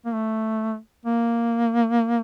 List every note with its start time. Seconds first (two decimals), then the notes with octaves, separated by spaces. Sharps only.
0.05 A#3
0.14 A3
1.05 A#3